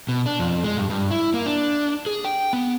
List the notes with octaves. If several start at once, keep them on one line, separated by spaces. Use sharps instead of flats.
B2
D4
F2
G#3
G2
G2
E4
A#3
D4
G#4
G5
B3